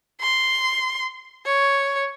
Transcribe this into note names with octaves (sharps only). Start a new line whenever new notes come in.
C6
C#5